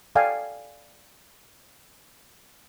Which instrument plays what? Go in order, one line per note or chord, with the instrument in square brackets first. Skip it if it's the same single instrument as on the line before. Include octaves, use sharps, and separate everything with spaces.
[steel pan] A4 D5 F5 G5 G#5